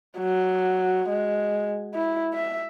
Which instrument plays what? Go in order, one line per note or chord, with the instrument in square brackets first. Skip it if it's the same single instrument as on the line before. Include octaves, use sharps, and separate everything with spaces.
[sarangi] F#3
G#3
E4
E5